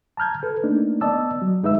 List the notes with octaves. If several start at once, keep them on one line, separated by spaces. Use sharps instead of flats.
A5 A#5 F6 G6 G#6
A4 B4
A3 A#3 D4 D#4
B3 D5 D#5 A5 E6
F#3
F#2 G#3 D#4 B4 E5 E6